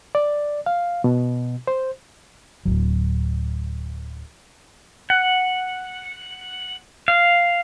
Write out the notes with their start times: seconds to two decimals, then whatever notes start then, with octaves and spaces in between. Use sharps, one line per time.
0.15 D5
0.66 F5
1.04 B2
1.67 C5
2.65 D1 B1 F#3
5.10 F#5
7.08 F5